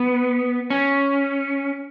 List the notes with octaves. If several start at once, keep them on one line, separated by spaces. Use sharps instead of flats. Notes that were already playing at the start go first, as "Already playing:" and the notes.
Already playing: B3
C#4